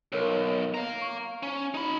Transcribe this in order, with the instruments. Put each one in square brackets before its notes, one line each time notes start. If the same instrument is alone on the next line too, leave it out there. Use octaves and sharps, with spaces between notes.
[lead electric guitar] B1 [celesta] A#4 C#5
[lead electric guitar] F5 A#5
[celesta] C#6
[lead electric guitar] C#4
D#4 B5